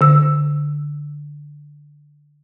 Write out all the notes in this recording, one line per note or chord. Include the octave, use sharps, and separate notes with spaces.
D3 E6